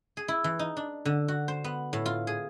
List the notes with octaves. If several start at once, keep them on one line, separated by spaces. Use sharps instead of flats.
G#4
E4
E3
D#4
D4
D3
F#4
C5
B3
A2
F4
G#4